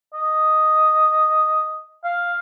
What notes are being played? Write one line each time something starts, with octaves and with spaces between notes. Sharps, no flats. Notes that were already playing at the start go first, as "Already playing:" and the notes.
D#5
F5